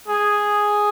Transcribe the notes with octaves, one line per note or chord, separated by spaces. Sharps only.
G#4